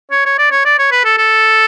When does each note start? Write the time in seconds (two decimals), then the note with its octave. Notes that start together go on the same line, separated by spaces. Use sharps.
0.11 C#5
0.26 C#5
0.38 D5
0.51 C#5
0.65 D5
0.79 C#5
0.92 B4
1.05 A4
1.18 A4